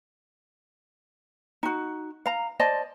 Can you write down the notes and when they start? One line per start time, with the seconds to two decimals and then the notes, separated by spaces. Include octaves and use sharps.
1.63 D#4 F#4
2.26 F5 A#5
2.59 C5 D5 D#5 A5